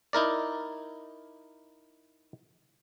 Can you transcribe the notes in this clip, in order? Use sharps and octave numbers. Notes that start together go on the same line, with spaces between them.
D#4 E4 A#4 D5